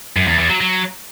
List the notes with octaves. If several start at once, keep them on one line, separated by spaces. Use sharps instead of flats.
F#2
E2
E2
F#3
F#3